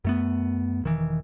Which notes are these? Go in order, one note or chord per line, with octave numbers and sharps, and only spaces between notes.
F#2 A3 B3
E1 D#3 E3